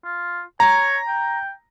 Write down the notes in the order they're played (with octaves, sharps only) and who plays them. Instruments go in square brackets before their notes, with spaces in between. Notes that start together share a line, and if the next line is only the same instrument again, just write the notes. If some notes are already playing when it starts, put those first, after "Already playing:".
[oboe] F4
[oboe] C#5 [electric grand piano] A#5
[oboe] G5